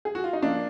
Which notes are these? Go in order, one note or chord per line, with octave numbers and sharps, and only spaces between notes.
G#4
F#4
F4
D#4
F3 A#3 D4